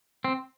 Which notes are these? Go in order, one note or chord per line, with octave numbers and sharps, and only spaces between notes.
C4